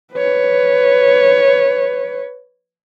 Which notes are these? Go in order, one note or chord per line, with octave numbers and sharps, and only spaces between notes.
B4 C#5